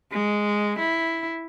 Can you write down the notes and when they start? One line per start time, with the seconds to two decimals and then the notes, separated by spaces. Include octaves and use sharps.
0.12 G#3
0.79 E4